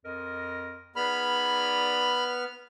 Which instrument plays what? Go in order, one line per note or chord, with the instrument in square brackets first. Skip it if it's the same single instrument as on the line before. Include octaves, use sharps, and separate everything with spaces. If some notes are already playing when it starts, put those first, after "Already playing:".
[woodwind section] F2 A#4 D#5
[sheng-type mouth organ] B3 F6 [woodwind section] D#4 G#4 D5 [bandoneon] B5